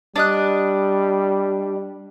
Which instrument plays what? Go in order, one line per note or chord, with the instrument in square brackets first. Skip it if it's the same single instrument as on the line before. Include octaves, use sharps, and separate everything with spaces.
[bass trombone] G3 [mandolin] D4 D#5 F#6